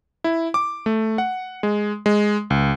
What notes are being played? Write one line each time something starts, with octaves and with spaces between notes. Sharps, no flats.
E4
D6
A3
F#5
G#3
G#3
C#2